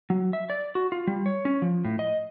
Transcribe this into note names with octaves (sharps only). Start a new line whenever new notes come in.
F#3
E5
D5
F#4
F4
G3
C#5
C#4
F3
A2
D#5